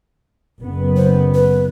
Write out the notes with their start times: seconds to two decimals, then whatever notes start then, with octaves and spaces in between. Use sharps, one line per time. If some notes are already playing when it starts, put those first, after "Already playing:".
0.60 F#1 B3
0.97 C5
1.35 B4